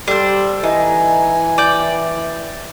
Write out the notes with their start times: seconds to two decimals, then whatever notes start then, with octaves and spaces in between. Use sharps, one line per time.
0.08 G3 D4 A4 C5
0.63 E3 D#4 G#5
1.58 D5 G5